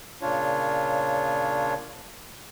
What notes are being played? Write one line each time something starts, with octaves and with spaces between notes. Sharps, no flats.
A#2 C#3 D4 F4 C#5